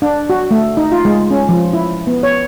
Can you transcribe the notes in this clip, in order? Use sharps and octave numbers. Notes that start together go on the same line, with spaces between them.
D4
F#4
A3
D#4
F4
G#3
C#4
F3
E4
B3
C#5